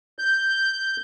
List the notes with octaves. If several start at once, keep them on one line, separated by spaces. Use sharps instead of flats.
G6